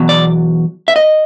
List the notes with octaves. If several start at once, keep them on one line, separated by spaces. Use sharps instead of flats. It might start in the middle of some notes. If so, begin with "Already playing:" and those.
Already playing: E2 B2 F#3
D5
E5
D#5